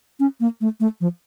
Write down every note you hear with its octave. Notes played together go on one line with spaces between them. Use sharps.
C#4
A#3
A3
A3
F3